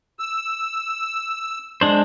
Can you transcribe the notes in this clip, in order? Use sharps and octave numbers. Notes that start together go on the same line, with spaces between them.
E6
G#3 D4 C5